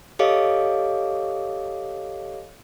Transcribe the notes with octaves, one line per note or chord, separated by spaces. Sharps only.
G4 A4 C#5 D#5 F5 D6